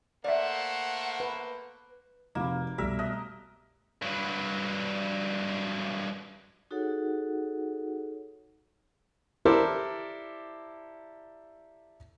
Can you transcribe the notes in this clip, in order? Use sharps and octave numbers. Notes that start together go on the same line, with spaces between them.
A3 A#3 C5 D5 E5 F#5
B4
F1 A#3 D#4 F#4 B5
C2 F2 B2 G3 A3 G4 A#4 E5
D#5 E5 A5 F#6
G2 F#3
D#4 F#4 G#4 A4 C#5 F#5
E4 G4 A4 A#4 C5 D5